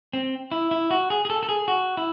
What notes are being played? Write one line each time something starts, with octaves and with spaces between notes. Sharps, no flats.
C4
E4
E4
F#4
G#4
G#4
A4
A4
G#4
F#4
E4